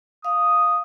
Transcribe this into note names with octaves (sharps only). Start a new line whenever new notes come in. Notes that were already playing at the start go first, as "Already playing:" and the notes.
F5 D#6